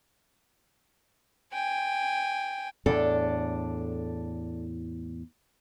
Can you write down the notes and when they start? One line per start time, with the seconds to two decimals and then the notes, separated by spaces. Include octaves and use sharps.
1.52 G5 G#5
2.86 E2 A2 D4 A4